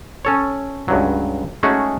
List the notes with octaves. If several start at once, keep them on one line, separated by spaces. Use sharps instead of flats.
C#4 A4 C#5
C#2 G2 F#3
G#3 A3 C#4 D#4 F#4 G#4